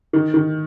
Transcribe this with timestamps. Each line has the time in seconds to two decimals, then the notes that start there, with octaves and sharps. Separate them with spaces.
0.13 D#3
0.34 D#3